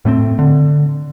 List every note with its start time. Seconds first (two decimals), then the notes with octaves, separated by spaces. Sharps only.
0.05 A2 A3 B3 C4
0.39 D3